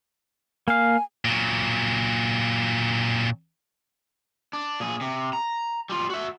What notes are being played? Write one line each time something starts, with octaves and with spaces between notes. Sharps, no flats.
A#3 F5 G#5
A#2 F#3
D4
A#2 G#4
C3
A#5
G3 F4
F#4 E5